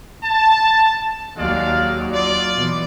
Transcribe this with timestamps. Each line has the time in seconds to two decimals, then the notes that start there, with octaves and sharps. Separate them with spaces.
0.23 A5
1.37 D#2 F#3 G#3 D5 F5
2.12 F4 D5
2.55 B2 E3